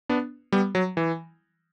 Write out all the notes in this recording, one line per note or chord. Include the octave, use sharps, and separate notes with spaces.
B3 D4
G3 B3
F#3
E3